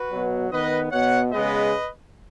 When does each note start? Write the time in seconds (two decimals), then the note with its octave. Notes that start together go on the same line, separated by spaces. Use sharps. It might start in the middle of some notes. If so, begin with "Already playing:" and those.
Already playing: F#4 B4
0.10 B2 F#3 B3
0.51 D#3 B3 B4 D#5
0.91 B2 B3 C#5 F#5
1.32 C#3 G#3 B3 B4 D#5